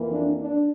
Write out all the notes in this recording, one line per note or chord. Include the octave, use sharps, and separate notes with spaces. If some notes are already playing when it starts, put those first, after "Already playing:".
Already playing: F2 E3 A#3
D4
D4